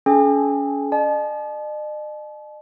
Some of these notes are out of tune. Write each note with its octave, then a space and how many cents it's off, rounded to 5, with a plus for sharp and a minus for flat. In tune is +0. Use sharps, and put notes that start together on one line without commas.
C#4 +30 G#4 +45 G5 +45
D#5 -45 A5 -40